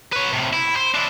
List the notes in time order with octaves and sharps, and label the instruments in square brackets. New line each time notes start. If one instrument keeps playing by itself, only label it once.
[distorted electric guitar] B4 C#5
A2 C3
E4
C5
D4 E4